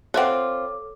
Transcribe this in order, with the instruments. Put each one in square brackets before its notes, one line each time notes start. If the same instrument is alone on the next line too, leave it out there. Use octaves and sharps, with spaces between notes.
[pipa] C4 F4 [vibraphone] A4 C#5 D6 [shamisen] B4 E5 F#5